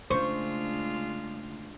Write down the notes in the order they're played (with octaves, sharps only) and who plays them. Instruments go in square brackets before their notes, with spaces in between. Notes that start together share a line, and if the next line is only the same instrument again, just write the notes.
[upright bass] C#3 A3 [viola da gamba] G#3 D4 F4 [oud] C5 [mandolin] C#6